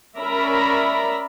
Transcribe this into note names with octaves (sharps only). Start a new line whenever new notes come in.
C#4 A#4 D5 E5 A#5 B5